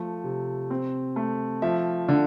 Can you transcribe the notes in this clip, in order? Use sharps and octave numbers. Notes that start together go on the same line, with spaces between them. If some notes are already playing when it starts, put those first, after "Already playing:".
Already playing: F3 A3
C3
C4
A3
F3 E5
D3